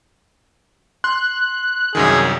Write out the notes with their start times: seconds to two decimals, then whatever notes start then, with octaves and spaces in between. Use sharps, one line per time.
1.04 C6 F#6
1.95 C2 F#2 D#3 G#4